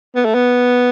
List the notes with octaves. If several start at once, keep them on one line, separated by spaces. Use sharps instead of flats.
B3
A3
B3